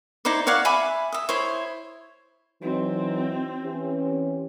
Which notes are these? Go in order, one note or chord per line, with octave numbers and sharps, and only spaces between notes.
D#4 E4 C5 D5
C#5 D5 F5 F#5
E5 G#5 B5 D6
E5 D#6
E4 C5 C#5
E3 F#3 C4 D#4
E3 C#4 G4